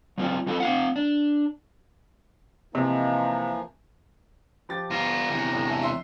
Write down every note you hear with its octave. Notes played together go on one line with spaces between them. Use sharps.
F#3 C4 F4 D5
F#3 C4 F4 A4
C4 F5 F#5
D4
C3 E3 F3 A#3 D#4
F3 G4 A6
B3 F4 A#5
E2 C3
A2
E5 G#5 A5
E5 C6 C7